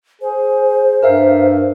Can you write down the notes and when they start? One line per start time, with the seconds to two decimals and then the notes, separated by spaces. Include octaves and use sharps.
0.21 G#4 C5
1.02 G2 A#4 E5 F5